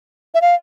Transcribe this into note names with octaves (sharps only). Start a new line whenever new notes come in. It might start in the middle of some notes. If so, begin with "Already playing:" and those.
E5
F5